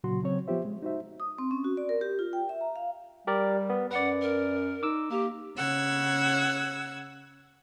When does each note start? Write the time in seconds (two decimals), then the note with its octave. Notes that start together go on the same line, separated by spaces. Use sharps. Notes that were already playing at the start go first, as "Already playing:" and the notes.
0.04 A#2 C#3 F#3 F#4 C6
0.23 C#3 F#3 C4 C#5
0.48 F3 B3 F4 G4 C5 E5
0.65 G#3
0.82 D#4 F#4 C5 E5
1.20 D#6
1.38 C4
1.51 C#4
1.64 F#4
1.77 D5
1.89 A#4
2.01 G4
2.19 F4
2.33 G5
2.49 E5
2.61 A#5
2.76 F5
3.27 G3 G4 A#4 D5
3.70 B3
3.91 F#2 B4 D5 F#5
4.21 A#4
4.83 D#4 D6 E6
5.11 A#3 G4
5.56 C#3 F#5 E6 G#6